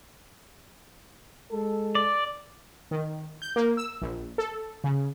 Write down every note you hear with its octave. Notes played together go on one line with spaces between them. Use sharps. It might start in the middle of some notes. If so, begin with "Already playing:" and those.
G#3 A4
D5
D#3
G6
A#3
E6
A#1
A4
C#3